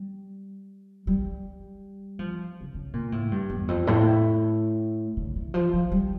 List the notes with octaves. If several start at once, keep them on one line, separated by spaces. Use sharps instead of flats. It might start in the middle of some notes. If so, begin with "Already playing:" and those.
Already playing: G3
G3
F3
C#3
C#3
A#2
A2
G2
E2
F2
A2
D3
E3
F3
F3
G3